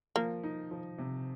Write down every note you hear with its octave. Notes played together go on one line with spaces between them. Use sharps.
F3 A#3
D#4
F3
C3